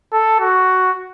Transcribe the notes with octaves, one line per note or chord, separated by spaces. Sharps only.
A4
F#4